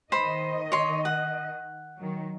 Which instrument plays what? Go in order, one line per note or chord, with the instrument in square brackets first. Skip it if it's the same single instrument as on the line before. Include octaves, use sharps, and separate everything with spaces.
[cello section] D#3 D#5 [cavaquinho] C5 B5
[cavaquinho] C#5 C6
F#5
[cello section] D#3 F#3